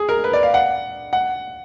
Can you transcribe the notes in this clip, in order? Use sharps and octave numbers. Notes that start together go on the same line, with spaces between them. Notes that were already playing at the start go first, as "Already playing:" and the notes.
Already playing: G#4
A#4
B4
D5
F5
F#5
F#5